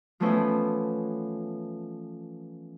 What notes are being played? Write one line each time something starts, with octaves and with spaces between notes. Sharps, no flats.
E3 F3 A3 B3 C#4 E4